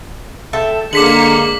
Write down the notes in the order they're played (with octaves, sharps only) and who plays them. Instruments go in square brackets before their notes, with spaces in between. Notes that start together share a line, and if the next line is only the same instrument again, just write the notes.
[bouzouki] A4 E5 G5
[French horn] D3 [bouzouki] G#3 [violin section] A#3 C#7 [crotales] D6 B6 F#7